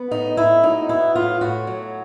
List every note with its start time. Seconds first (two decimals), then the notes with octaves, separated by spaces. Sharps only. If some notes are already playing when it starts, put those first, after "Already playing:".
Already playing: B3
0.11 A2 D#4
0.37 A2 E4
0.63 F#3 D#4
0.89 B3 E4
1.15 A2 F4
1.41 A2 F#4
1.67 F#3